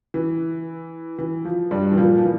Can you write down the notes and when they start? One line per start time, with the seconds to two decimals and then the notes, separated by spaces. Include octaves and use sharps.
0.14 E3
1.19 E3
1.45 F3
1.71 G2 G3
1.92 E3
1.97 A#2 F3
2.18 F3
2.24 E3